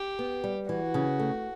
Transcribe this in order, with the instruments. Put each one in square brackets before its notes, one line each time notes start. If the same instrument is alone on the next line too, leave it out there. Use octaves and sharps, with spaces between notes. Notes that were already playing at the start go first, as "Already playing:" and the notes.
Already playing: [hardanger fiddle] G4
[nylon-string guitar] B3
G3
[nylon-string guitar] E3 [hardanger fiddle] F#4
[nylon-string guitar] C#3
A3